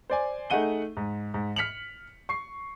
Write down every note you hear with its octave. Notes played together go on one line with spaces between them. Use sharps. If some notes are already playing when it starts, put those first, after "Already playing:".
C5 D5 G#5
A3 D#4 G#4 F#5 D#7 G7
G#2
G#2
F6 B6 C#7 F7 F#7
C#6 C7